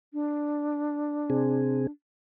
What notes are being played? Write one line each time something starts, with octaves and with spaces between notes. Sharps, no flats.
D4
C3 C4 G#4